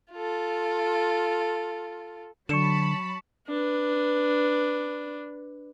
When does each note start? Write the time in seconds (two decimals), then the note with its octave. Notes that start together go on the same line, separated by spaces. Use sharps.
0.12 F4 A4
2.49 D3 F#3 A5 B5 C#6 C#7 E7
3.48 D4 B4